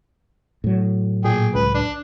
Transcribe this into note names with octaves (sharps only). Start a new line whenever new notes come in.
A2 F#3
A#2 G#4 G5
C#2 B4
D4